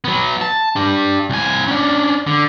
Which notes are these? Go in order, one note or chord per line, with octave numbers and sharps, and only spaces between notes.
F#3 B3
A5
D4 G4
C2 G#5
C#4 D4
D3